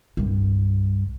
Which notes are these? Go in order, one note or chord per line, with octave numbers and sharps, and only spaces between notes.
C2 G2